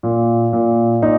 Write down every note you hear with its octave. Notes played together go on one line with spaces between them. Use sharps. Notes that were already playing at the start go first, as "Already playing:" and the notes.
A#2
A#2
A#2 D#4